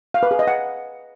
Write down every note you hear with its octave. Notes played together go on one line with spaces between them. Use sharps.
F5
B4
G#4
D#5
F#5